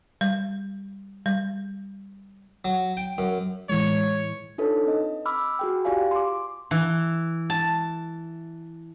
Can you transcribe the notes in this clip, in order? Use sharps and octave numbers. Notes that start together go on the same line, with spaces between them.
G3
G3
F#3
G5
F#2
A2 E3 G#3 C#5
D4 D#4 F4 A4 B4 C#5
C4 D#5
B5 D6 E6 F6
F#4 G#4 G5
F4 G4 D5 F5 G#5
C6 D6
E3
A5